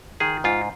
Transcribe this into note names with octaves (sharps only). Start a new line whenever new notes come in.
D#3 G#4
G#2 F4